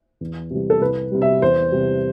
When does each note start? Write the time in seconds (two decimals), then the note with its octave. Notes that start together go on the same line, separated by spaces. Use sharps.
0.21 E2
0.50 C3 E3 G3
0.70 A4
0.81 C2 B4
1.12 C3 G3
1.22 E5
1.42 E2 C5
1.72 C3 G3